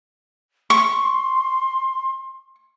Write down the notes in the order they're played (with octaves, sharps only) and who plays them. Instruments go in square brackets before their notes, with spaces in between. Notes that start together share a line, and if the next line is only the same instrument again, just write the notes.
[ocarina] C6 [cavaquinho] C#6